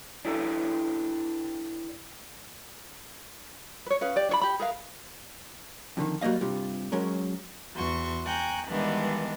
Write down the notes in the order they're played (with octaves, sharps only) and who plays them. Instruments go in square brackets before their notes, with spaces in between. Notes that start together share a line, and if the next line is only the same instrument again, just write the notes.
[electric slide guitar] D4 E4 G4 A4 B4
[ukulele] B4 C#5
C#4 G#4 B4 F5
G4 D5
D4 C#5 B5
G4 B5
G#4 A#4 B4 F5
[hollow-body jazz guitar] F2 D3 D#3
F#3 G3 A#3 D#5 F5
G2 C3 G3 F4
F#3 G#3 C#4 A#4
[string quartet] E2 F#4 C6 C#6
G5 G#5 A#5 C#6 F#6 G6
G2 D#3 E3 G#3 B3 D4